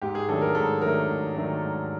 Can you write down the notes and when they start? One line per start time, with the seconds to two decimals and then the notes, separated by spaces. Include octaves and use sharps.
0.02 G#2 G4
0.15 G#4
0.28 D#3 F#3 A3 D4 A4
0.42 A#4
0.55 G#2 A4
0.81 D#3 F#3 A3 D4 A#4
1.08 G#2
1.35 D#3 F#3 A3 D4
1.61 G#2